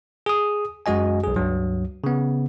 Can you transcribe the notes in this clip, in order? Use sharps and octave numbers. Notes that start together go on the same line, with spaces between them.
G#4 D#6
F#2 G#3 F#4 D#5 G#5
B1 G#4
C#2 G2 F#3
C#3 B3